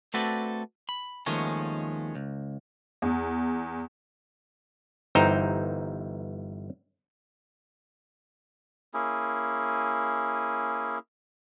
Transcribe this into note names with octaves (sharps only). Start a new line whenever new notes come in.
A3 C4 F#4 A4 B4 D5
B5
D#2 D#3 F3 G#3 A3 C#4
C#2
E2
G1 E3 D#4 C5 G5 A#5
A#3 C#4 E4 G#4